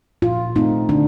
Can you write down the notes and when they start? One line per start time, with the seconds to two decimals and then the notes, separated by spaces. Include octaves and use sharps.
0.22 A#2 F4
0.56 A3 C4 D#4
0.89 D3 D4